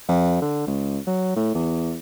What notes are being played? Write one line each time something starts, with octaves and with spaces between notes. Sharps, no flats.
F2
D3
C#2
F#3
A2
E2